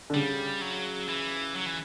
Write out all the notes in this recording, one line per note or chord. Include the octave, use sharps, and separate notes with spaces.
D3
C#3 G3
F#3
E3
F#3
E3